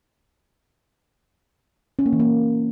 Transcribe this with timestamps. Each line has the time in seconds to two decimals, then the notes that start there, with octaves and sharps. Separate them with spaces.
1.99 C#4
2.06 A#3
2.13 E3
2.20 A#3